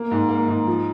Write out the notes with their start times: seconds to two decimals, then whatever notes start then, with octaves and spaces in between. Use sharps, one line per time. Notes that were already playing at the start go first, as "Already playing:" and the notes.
Already playing: A#3
0.11 G#2
0.29 A#3
0.48 G#2
0.67 F3